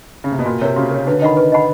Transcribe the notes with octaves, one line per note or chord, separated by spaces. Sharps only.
C#3
C3
B2
A#2 F#4
C3 A#4 C#5
C#3 F#4
A#4 C#5
D3 B4
D#3 D#5 F#5 B5
B4
D#5 F#5 B5